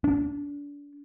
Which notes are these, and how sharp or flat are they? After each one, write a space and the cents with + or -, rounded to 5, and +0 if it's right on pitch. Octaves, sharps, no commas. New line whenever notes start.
D4 -30